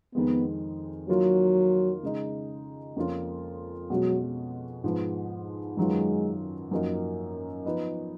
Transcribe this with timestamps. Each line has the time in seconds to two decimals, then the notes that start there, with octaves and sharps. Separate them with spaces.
0.15 F2 D#3 G#3 B3
1.09 D#3 F#3 A#3 F4
2.03 C#3 G#3 D#4
2.96 F2 F3 A#3 C#4 F4
3.90 B2 F#3 G#3 C#4 F#4
4.84 G#2 F3 G#3 B3
5.77 F#2 D#3 F#3 G#3 B3 F4
6.71 F#2 F3 A#3 D#4 F#4
7.65 F3 B3 D#4